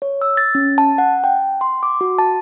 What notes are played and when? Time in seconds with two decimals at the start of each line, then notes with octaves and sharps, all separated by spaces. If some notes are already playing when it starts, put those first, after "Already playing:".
0.02 C#5
0.21 E6
0.37 A6
0.55 C#4
0.78 A5
0.98 F#5
1.24 G5
1.61 C6
1.83 D6
2.01 F#4
2.18 A5